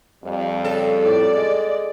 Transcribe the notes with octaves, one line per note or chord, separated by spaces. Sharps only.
F2 G3
C#3 A4
A2 D5
G#3